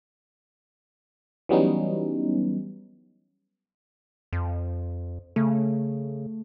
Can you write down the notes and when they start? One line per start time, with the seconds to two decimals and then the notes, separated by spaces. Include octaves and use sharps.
1.49 E3 F#3 G3 B3 C#4 D#4
4.33 F2
5.36 C#3 A3